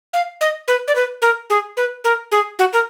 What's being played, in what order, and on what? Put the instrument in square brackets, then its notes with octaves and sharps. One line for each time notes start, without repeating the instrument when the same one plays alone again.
[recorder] F5
D#5
B4
D5
B4
A#4
G#4
B4
A#4
G#4
F#4
A#4